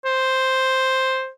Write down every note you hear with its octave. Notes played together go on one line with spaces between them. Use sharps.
C5